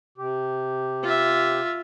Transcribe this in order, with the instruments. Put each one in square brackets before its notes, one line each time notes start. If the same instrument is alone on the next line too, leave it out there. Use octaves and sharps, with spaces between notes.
[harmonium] C3 G4
[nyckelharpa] F4 E5